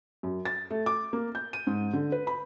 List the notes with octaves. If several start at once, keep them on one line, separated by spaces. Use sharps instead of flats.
F#2
A6
A3
D6
A#3
G6
D#7
G#2
D3
B4
B5